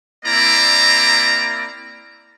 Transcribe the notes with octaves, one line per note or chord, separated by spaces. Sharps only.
A#3 C4 E4 D5 A#5